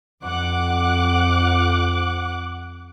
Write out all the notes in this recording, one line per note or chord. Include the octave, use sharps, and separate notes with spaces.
F2 F#5 D6 F#6